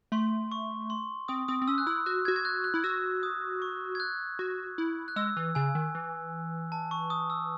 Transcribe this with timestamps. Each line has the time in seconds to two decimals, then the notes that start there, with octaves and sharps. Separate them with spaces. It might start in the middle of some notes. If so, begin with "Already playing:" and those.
0.12 A3 C6
0.52 C#6
0.90 C6
1.28 C4 D#6
1.48 C4 D#6
1.62 C4
1.68 C#4 E6
1.78 F#6
1.87 E4 E6
2.06 F#4 F#6
2.25 G#6
2.28 F#4
2.36 G#6
2.45 F#6
2.64 F#6
2.74 E4
2.84 F#4 E6
3.23 D#6
3.62 C#6
3.95 G#6
4.00 F#6
4.39 F#4
4.78 E4
5.08 F#6
5.16 G#3 E6
5.37 E3
5.55 C#3 G#5
5.75 D#3
5.95 E3
6.72 A5
6.91 C#6
7.10 D#6
7.30 E6